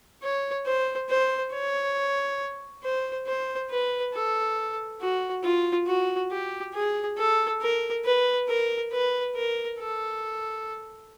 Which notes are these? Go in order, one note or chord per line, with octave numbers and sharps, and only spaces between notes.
C#5
C5
C5
C#5
C5
C5
B4
A4
F#4
F4
F#4
G4
G#4
A4
A#4
B4
A#4
B4
A#4
A4